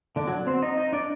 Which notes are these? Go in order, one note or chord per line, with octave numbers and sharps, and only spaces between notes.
D3 D4
F#3 F#4
C4 C5
D#4 D#5
D#4 D#5
D4 D5